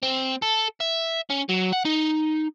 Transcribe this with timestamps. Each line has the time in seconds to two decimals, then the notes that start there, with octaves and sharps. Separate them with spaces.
0.03 C4
0.42 A4
0.81 E5
1.30 C#4
1.49 F#3
1.73 F#5
1.85 D#4